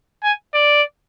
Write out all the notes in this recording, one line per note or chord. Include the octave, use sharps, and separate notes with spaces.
G#5
D5